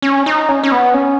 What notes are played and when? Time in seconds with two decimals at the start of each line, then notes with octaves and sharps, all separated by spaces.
0.02 C#4
0.26 D#4
0.49 C#4
0.63 C#4
0.72 B3
0.94 C#4